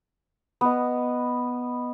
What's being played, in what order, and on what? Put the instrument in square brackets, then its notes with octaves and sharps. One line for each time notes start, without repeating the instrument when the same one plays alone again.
[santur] B3 D#5